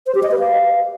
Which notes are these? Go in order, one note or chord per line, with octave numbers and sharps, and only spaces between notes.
C5
G4
D#5
B4
F5